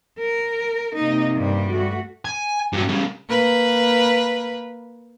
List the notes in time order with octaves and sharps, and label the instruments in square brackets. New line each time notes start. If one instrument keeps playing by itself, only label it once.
[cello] A#4
[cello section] C3 A#3 [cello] D#4
[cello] G2 G3
[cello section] A3 F#4
[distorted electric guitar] G#5
G2 F#3
C#3 G3
[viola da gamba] A#3 B4